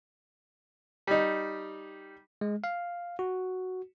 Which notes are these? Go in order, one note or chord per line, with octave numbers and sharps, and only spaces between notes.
G3 D#4
G#3
F5
F#4